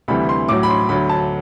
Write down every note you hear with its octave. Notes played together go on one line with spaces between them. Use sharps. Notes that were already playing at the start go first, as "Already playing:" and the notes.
D2 C3 E3 G3 B5
C6
A2 F#3 D6
B5
C6
D2 D3 F#3 B5
A5